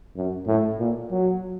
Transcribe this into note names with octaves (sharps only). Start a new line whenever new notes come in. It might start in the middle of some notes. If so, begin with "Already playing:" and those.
F#2
A2
A#2
F#3